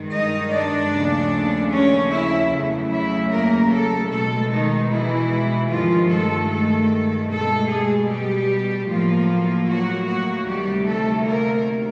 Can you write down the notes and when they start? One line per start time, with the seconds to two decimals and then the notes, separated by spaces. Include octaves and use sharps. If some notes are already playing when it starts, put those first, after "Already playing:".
Already playing: G2 D#3 G#3
0.13 D#4 D#5
0.52 D4 D5
0.92 D#2 C#3 F3 A3
1.72 C#4 C#5
2.12 E4 E5
2.51 E2 C#3 F#3 A3
2.91 E4 E5
3.30 A#3 A#4
3.71 A3 A4
4.10 B2 G#3 A3 A4
4.50 D#3 D#4
4.90 E3 E4
5.69 G2 D#3 F3 G#3 F4
6.09 A3 A4
6.48 A3 A4
7.28 B2 G#3 A3 A4
7.68 G#3 G#4
8.08 G3 G4
8.87 A2 F3 F#3 A#3 F4
9.66 F#3 F#4
10.06 F#3 F#4
10.46 D2 C3 D#3 G3 G4
10.85 A3 A4
11.25 A#3 A#4